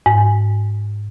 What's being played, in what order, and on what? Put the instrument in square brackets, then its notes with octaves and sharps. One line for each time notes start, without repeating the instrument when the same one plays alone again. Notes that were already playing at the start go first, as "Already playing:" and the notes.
[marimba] G#2